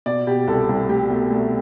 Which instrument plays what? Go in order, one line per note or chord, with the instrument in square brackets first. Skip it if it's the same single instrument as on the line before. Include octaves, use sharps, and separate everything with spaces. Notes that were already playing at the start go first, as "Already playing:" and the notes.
[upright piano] B2 D5
B2 G4
C2 A4
C2
A3 G4
B2
A3